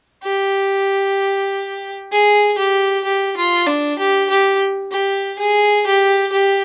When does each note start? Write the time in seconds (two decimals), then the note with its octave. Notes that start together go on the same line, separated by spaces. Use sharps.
0.24 G4
2.12 G#4
2.58 G4
3.05 G4
3.37 F4
3.67 D4
3.99 G4
4.30 G4
4.92 G4
5.39 G#4
5.86 G4
6.32 G4